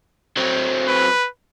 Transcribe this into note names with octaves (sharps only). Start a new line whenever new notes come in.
F#3 C4
B4